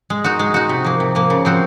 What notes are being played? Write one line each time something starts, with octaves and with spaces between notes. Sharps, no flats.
G#3
D#4 F#4
G#3
D#4 F#4
C3
F3 A#3
C3
F3 A#3
C#3
F3 C4 F#4